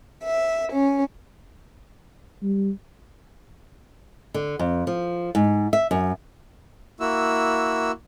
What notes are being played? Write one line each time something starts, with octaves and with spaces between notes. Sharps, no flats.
E5
C#4
G3
D3
F2
F3
G#2
E5
F#2
A#3 E4 F#4 E6